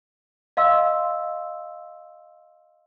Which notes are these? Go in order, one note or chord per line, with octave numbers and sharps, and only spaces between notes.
D#5 F5 C6 E6